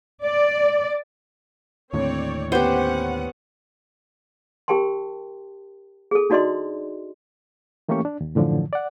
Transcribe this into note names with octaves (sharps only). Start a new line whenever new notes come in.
D5
D#2 A2 D3 C4 C#5 D5
B3 C#4 G4 C5 F#5
G4 A#4 G5 A5 C6
G#4 A4
D4 D#4 F#4 D5 D#5 C6
E3 A3 A#3 C#4 G4 C#6
D4
D#2
F#2 A2 D3 E3 F3
D5 F#5